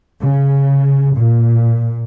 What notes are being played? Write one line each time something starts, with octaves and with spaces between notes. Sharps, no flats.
C#3
A#2